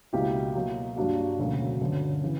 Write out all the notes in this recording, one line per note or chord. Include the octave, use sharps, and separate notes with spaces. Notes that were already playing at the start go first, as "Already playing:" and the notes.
C#2 B2 A#3 E4 G4
B2 F#3 A#3
G2 F#3 A#3 D4 F#4
E1 D2 C#3 F#3 A#3
G1 F#2 D3 F#3
C#3 E3